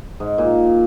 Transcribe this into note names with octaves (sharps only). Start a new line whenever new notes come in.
G#2
A#2